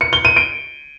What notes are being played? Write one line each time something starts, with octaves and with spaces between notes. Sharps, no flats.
C#7
G7
D#7
D7